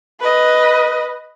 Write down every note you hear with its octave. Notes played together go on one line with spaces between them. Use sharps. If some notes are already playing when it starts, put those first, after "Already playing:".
B4 D#5